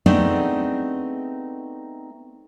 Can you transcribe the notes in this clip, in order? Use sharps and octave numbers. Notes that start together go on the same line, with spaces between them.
A3 B3 C4 D4 D#4 G#4